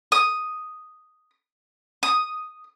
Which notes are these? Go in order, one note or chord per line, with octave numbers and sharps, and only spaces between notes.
D#6
D#6